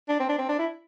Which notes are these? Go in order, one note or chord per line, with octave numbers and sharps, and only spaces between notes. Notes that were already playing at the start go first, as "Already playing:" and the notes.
D4
C4
D4
C4
D4
E4